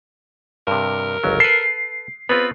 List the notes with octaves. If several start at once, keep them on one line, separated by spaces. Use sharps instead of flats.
G2 C3 A#4
G1 C#2 F#3
A4 B4 C7
B3 C4 F4 B4